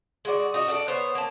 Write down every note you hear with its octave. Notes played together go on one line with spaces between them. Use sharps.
G#3 F#4 D5
D#4 F#4 D#5
D4 A4 D5 E5
B3 C5 C#5
A#3 A5